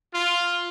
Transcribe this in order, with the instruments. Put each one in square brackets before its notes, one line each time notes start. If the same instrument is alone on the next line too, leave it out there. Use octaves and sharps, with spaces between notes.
[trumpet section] F4